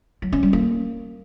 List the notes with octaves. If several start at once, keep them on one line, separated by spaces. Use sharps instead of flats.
F#3
C#4
G3
A#3